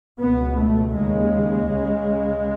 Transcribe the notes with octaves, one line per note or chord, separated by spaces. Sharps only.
C#2 B2 B3
A3
D#2 C#3 G#3
C#2 C#3